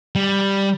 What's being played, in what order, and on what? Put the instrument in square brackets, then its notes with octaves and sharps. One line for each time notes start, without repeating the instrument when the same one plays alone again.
[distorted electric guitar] G3